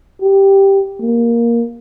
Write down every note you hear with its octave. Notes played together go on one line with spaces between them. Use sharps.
G4
A#3